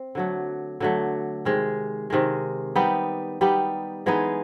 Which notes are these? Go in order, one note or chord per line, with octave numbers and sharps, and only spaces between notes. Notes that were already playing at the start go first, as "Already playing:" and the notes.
Already playing: C4
D3 F#3 A3
D3 F#3 A3
C3 D#3 G#3
C3 D#3 G#3
G3 B3 D#4 G4
G3 B3 D#4 G4
E3 G#3 B3 D#4